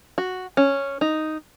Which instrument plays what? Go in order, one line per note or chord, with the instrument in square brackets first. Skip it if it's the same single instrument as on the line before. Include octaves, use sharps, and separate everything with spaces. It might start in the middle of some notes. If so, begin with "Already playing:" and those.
[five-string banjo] F#4
C#4
D#4